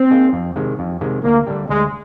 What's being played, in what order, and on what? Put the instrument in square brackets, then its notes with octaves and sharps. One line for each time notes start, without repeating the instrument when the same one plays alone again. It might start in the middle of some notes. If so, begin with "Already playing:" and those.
Already playing: [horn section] C4
[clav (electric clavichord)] A#3 D#4 G#4
F2
C3 D#3 G#3
F2
C3 D#3 G#3
[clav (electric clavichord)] D2 [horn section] A#3
[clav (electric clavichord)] D3 G3 D4 G4
[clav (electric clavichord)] D2 [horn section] G#3